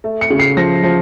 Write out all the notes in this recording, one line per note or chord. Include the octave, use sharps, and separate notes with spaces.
A3
C#7
C#3
C7
F3 A#6
F3